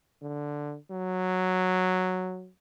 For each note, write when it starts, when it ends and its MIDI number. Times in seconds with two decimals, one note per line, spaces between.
0.22 0.77 50
0.91 2.50 54